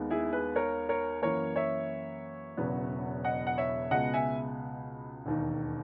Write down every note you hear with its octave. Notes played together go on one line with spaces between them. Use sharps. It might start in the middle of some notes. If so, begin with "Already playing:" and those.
Already playing: D#2 D#3 G#3 B3
E4 G#4
G#4 B4
A#4 C#5
A#4 C#5
F#2 E3 A#3 A#4 C#5
C#5 E5
E1 E2 C#3 F#3 B3
D#5 F#5
F#5
C#5 E5
C#2 B2 G#3 B3 D#5 F#5
E5 G#5
E1 D#2 D#3